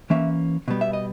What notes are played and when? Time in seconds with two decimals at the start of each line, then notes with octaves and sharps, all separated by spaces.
0.10 E3 A#3 C#4 E5
0.68 B2 G3 B3
0.81 E5
0.93 D#5